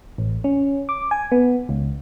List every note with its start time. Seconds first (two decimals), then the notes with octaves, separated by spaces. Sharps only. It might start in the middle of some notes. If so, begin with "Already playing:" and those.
0.18 A1
0.44 C#4
0.89 D6
1.11 G#5
1.32 B3
1.69 C#2